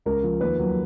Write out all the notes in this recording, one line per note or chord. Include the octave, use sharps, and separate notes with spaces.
C#2 A#4
F3
D#2 B4
F#3